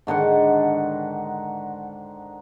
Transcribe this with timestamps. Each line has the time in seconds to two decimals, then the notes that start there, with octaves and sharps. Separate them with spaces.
0.07 G#2 D3 D#3 F#5